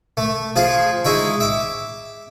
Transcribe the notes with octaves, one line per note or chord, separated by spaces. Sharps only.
A3
F3 F4 G#4
G#3 D#4 E4 C#6
E5 D6